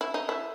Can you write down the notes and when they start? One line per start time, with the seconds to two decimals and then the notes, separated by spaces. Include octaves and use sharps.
0.01 E4
0.14 D#4
0.29 E4